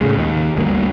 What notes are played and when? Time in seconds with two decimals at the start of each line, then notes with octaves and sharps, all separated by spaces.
0.01 A2 C#3 G#3
0.16 D#2 D#3
0.56 G1 D2 G2 A#3